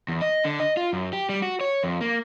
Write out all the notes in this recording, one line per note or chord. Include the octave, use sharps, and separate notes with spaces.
E2
D#5
D3
D#5
F4
F#2
G4
G3
F#4
C#5
F2
A#3